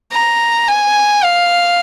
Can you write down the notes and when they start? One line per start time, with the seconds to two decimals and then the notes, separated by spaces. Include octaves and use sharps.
0.12 A#5
0.68 G#5
1.24 F5